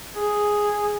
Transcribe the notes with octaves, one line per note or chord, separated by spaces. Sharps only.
G#4